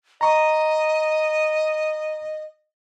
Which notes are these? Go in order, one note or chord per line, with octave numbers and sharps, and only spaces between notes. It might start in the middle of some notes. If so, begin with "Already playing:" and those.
D#5 A#5 C#6